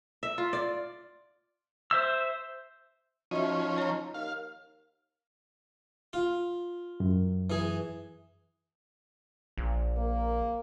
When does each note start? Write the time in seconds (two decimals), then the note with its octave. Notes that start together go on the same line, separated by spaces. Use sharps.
0.23 E5
0.38 F4
0.53 D5
1.91 C5 E5 E6
3.31 F3 C#4 D#4 F#4 E5
3.78 C#5 A#5
4.14 D#2 F5
6.13 F4
7.00 F#2
7.50 E3 G#4
9.57 A#1
9.97 A#3